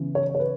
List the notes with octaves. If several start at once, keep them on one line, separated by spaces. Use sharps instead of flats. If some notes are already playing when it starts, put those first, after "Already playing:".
Already playing: C#3 E3 B3
C#5
C#5
B4